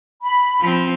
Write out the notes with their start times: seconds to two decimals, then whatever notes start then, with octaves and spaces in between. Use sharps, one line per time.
0.22 B5
0.60 F3 C4